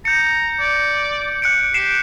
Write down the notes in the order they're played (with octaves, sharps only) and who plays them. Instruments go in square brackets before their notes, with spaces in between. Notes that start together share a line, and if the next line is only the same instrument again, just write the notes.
[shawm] A#5 [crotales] G6 C#7
[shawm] D5
[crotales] F#6 C#7 D7
[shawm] G4 [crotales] C7 D7 E7